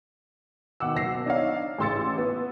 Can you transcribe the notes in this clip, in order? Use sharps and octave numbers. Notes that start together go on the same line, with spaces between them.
B2 D#3 F#5 D6 E6
F#1 B2 A#6 C7
D4 D#4 C#5 F5
A1 C#3 C6 E6 A6 C#7
B3